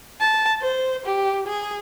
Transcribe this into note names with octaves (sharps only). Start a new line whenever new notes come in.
A5
C5
G4
G#4